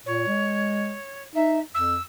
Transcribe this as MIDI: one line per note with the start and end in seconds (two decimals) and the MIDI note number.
0.06 0.26 46
0.06 1.24 73
0.27 0.96 56
1.35 1.60 63
1.35 1.59 76
1.75 2.00 41
1.75 2.02 88